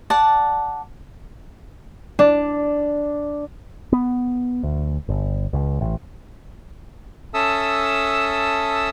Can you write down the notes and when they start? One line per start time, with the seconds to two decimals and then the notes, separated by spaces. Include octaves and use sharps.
0.10 D5 F#5 A5
2.19 D4
3.92 B3
4.63 D2
5.09 G1
5.53 C#2
5.81 A1
7.34 C#4 A4 E5 A5 D#6 E6